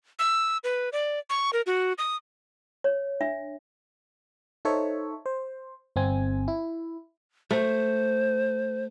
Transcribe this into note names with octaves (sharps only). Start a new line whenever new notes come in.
E6
B4
D5
C#6
A#4
F#4
D#6
C#5
D4 E5
D#4 A4 C5 C#5 E5
C5
G1 C4 G#5
E4
A3 C5